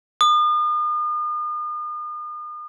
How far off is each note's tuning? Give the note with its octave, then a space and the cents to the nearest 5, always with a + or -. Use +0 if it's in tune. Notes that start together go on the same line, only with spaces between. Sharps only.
D#6 -40